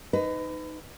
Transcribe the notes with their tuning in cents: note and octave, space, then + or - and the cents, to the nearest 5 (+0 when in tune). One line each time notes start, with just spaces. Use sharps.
D#4 +0 B4 +30